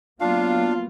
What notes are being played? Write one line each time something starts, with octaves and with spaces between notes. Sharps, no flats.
F#3 A#3 B3 D4 F4 F5